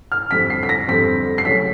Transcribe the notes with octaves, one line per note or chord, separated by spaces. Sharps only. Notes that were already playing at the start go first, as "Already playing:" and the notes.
F6
F2 D3 G3 C4 B6
C7
B6
A#6
F2 D3 G3 C4 B6
C7
C#3 F#3 A3 C#4 B6